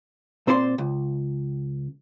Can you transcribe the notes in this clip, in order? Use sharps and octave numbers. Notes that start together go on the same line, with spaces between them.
A#2 C4 C5 D5 D#5 C6
C#2